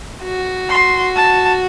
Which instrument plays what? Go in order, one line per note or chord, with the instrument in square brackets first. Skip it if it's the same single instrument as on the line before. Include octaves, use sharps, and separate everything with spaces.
[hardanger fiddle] F#4
[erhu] C6
A5